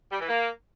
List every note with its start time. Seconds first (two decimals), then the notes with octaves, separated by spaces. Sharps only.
0.12 G3
0.20 E3
0.29 A#3